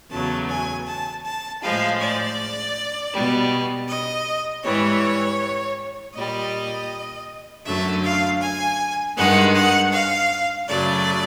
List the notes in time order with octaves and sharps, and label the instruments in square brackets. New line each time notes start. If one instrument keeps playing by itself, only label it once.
[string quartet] E2 C#3 F#3 A3 A5
G#5
A5
A5
A2 F3 G#3 F5
D5
B2 G3
D#5
G#2 E3 G3 C#5
A#2 G3 D#5
F#2 D3 F#3 A3 E5
F5
G#5
G2 D#3 G#3 F#5
F#5
F5
F#2 C#3 F#3 A3 D5